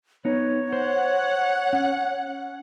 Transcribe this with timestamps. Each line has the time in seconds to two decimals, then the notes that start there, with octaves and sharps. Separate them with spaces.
0.25 B3 D#4 C#5
0.73 C5 F#5
1.73 C#4